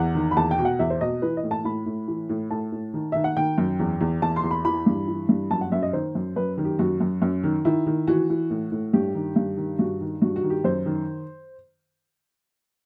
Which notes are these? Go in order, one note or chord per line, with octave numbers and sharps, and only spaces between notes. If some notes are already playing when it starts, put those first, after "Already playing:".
Already playing: E2 F#5
D#3
B5
E2 A5
G5
B2
F#5
E2 E5
C5
B2 D#5
E3 B4
D#5
A2
A5
A2 B5
A2
E3
A2
A2 A5
A2
D#3
D#3 E5
F#5
D#3 G5
F#2
E2
E2
E2 A5
C6
E2
B5
E3 B5
G2
E3
G2
F#2 A5
F#5
F#2 E5
D#5
D#3 C5
F#2
F#2 B4
D#3
G4
F#2 F#4
F#2
F#2
D#3
D#3 E4
D#3
E3 F#4
E3
A2
A2
G2 G4
D#3
G2
D#3
G2 F#4
D#3
G2 F#4
F#4
D#3
G4
F#2 C5
D#3